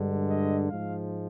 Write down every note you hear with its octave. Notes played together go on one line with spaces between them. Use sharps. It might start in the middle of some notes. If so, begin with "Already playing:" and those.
Already playing: G2 D3 G#3
D#5
G#2 F3 G#3 F5